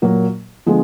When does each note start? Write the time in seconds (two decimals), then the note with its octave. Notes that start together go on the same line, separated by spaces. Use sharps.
0.02 A#2 F#3 A#3
0.66 D3 F3 G#3 B3